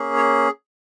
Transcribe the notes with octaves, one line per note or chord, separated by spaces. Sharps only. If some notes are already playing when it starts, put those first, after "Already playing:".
Already playing: A#3 C#4 G#4
C#5